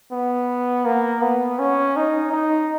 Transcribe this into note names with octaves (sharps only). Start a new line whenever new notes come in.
B3
A#3
B3
C#4
D#4
D#4